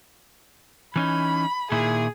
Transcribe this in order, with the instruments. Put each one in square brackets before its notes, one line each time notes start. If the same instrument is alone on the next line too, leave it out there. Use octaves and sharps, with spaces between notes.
[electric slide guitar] E3 C#4 D#4 [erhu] B5
[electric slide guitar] A#2 D#3 E4 [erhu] G#4